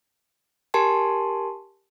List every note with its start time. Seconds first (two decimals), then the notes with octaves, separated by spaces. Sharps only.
0.74 G4 A#4 G#5 A5 C6